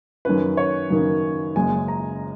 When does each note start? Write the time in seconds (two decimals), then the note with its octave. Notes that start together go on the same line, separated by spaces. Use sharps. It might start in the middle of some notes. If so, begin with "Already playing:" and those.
0.25 F#2 D#3 A#3 C#4 B4
0.57 C#5
0.90 F#2 D#3 A#3 C#4
1.55 F#1 F#2 C#3 G#3 G#5
1.88 A#5